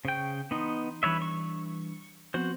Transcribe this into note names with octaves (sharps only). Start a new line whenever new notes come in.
C#3 C5 G5 C#6
E3 B3 D#4 A#5 C6
E3 G3 D4 B4 C#5 E5
C#6
F3 B3 C4 F#4 C5